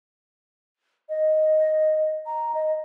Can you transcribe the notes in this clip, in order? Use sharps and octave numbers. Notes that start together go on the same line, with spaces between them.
D#5
A#5
D#5